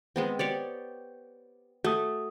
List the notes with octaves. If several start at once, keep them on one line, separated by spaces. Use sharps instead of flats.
G#3 B3 C4
G4 C#5 D5
A3 F#4 D#6